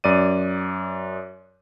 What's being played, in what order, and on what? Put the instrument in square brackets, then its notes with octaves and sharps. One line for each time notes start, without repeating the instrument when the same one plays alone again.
[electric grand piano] F#2 D5 D#7